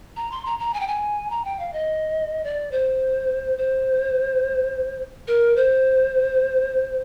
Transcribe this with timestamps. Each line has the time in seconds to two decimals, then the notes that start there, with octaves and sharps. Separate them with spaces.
0.16 A#5
0.32 C6
0.46 A#5
0.59 A#5
0.74 G#5
0.80 G5
0.88 G#5
1.30 A#5
1.45 G5
1.59 F5
1.73 D#5
2.44 D5
2.72 C5
3.58 C5
5.28 A#4
5.56 C5